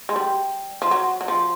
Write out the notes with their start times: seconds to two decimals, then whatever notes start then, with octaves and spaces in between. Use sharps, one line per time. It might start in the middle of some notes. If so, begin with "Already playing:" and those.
0.09 G#3
0.16 G3
0.82 F3
0.91 F#3
1.21 F#3
1.28 F3